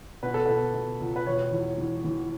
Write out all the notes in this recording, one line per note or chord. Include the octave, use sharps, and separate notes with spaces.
B2 B4
A4
B2 B4
B2
C#2
B4
E1 C#5
E2
E3
E3